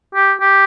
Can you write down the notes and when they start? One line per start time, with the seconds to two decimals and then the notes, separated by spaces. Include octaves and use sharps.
0.15 G4
0.41 G4